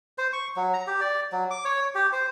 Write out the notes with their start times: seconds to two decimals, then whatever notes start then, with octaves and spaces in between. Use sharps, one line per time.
0.18 C5
0.33 C#6
0.56 F#3
0.73 A#5
0.87 G4
1.01 D5
1.32 F#3
1.51 D6
1.65 C#5
1.82 C#5
1.95 G4
2.13 C5